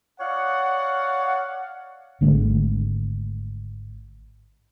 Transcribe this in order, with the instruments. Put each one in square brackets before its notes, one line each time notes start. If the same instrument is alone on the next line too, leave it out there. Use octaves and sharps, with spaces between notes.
[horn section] C#5 D5 F5 F#5
[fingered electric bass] G#1 D3 G#3 A3